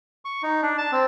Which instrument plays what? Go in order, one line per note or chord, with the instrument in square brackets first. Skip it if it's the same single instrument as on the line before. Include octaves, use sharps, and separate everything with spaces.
[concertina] C#6
D#4
D4
A5
C4